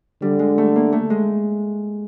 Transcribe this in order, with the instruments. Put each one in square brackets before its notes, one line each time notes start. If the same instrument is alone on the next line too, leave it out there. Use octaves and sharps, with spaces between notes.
[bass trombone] D3 [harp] G3
[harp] G#3
A3
A#3
A3
G#3